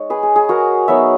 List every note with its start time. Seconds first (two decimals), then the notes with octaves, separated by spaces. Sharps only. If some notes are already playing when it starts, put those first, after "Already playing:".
Already playing: G#3 D#4 C#5
0.10 G#4 B4
0.23 G#4
0.36 G#4
0.49 F#4 A#4
0.88 F#3 B3 D#4 C#5 E5